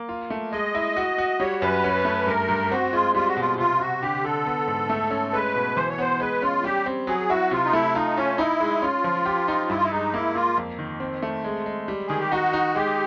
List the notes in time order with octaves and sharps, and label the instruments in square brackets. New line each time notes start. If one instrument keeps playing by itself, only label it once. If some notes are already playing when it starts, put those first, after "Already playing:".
Already playing: [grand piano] A#3
F4
A3
[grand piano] G#3 [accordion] D#5
[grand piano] E4
F#4
F#4
[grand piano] G3 [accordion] C#5
[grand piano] F#2 [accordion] B4
[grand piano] C#4
A3
[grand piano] G2 [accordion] A#4
[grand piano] G2
[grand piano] C4 [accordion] F#4
[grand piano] G#3 [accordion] F4
[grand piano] G3 [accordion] F4
[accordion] F#4
[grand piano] B2 [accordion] F4
[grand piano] C3 [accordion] F4
[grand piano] C3 [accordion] F#4
[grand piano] D3 [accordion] G4
[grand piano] D3 [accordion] A4
[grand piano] B3
G#2
A3
C#4
[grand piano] G#3 [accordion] B4
[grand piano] B2
[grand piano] E3 [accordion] C5
[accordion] C#5
[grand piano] B3 [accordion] C5
[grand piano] G#3 [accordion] B4
[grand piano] C#4 [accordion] F4
[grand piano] G3 [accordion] G4
[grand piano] C4
[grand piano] F#3 [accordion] G#4
[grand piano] E4 [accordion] F#4
[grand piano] C3 [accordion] F4
[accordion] D#4
[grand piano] A3 [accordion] E4
[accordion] D#4 [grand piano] F4
[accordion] C#4 [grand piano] F4
[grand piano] D#4 [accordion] E4
[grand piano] G#3
[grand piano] C#4 [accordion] F4
[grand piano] F3
G4
D#4
[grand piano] G2 [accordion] E4
[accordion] F4
E4
[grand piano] G#3 [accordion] D#4
[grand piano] A#3 [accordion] E4
[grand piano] A#3 [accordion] F4
[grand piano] F2
D#3
C4
A3
G#3
G#3
G3
[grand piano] D#3 [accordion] G#4
[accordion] G4
[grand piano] D#4 [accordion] F#4
[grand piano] D#4
[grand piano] G#3 [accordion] G4